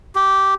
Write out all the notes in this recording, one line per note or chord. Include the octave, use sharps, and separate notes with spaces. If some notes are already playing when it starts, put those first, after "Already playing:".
G4